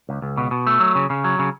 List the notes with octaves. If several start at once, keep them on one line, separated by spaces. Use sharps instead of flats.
C#2
C#2
B2
B2
A3
F#3
C#3
C#3
F#3
C#3